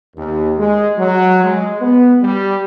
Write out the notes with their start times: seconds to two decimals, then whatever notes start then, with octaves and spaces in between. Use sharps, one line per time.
0.17 D#2
0.58 G#3
0.98 F#3
1.44 G#3
1.81 B3
2.23 G3